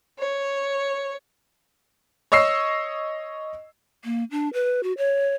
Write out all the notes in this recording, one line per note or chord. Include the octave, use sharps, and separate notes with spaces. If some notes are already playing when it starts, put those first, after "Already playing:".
C#5
C#5 D#5 C#6 E6 C7
A#3
D4
B4
F#4
C#5